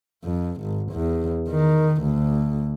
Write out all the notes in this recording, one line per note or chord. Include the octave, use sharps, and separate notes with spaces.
F2
G#1
E2
D#3
D2